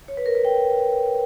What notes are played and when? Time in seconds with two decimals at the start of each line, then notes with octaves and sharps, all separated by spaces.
0.08 C#5
0.17 B4
0.26 A#4
0.35 B4
0.45 G5